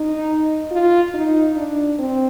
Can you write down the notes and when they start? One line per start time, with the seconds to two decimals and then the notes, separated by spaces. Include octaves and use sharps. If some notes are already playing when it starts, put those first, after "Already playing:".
Already playing: D#4
0.71 F4
1.14 D#4
1.56 D4
1.99 C4